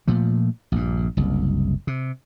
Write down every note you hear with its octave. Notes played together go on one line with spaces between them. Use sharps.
A#2 F3 A3
A#1 G2
F#1 C2
C3